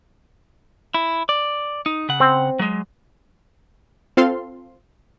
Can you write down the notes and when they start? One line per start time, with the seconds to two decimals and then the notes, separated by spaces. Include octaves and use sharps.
0.94 E4
1.29 D5
1.86 D#4
2.09 C#3 F#5
2.20 C4
2.59 F#3 G#3
4.17 C4 F4 A4 F5 C6